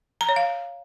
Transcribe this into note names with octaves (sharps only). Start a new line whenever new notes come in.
A#5
C#5
F5